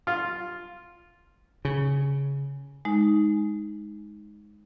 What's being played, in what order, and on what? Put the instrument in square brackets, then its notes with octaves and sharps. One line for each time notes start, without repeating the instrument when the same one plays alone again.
[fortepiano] F4
[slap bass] C#3
[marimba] G#3 D#4